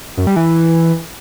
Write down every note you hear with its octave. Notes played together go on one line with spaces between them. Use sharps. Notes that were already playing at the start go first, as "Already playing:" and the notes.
F#2
G3
E3